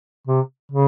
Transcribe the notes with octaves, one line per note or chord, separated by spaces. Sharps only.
C3
C#3